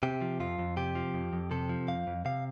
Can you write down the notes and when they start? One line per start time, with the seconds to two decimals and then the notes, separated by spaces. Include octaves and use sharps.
0.03 C3 G4
0.21 F3
0.40 F2 F4
0.59 F2
0.77 C3 G4
0.95 F3
1.14 F2
1.33 F2
1.51 C3 A4
1.69 F3
1.88 F2 F5
2.07 F2
2.25 C3 F5